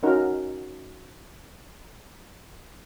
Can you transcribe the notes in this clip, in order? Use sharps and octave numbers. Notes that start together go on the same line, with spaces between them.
C#4 D#4 F#4 A#4 F#5